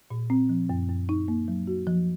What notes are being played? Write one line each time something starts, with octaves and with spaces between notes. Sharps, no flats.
A#2
C4
F3
F#2
F#2
D#4
A#3
F#3
F#4
F3